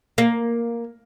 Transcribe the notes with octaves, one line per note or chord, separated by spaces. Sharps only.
A#3